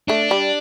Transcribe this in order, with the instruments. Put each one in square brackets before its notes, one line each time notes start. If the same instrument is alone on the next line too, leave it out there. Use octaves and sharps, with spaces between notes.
[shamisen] A3 [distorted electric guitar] D4
[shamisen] G3